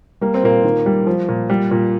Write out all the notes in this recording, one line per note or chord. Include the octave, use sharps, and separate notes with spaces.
G3 A#3
C4
A#2 A#3
D#3
G3
F3
A#2
G3
A#2